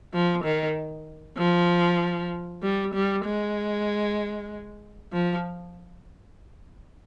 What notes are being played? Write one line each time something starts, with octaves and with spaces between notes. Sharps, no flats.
F3
D#3
F3
G3
G3
G#3
F3